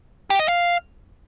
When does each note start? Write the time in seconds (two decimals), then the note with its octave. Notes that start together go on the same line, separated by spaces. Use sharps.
0.30 G4
0.39 D#5
0.48 F5